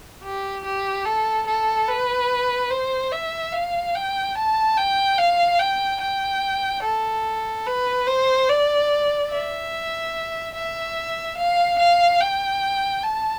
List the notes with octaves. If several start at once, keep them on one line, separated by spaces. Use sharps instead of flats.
G4
G4
A4
A4
B4
C5
E5
F5
G5
A5
G5
F5
G5
G5
A4
B4
C5
D5
E5
E5
F5
F5
G5
A5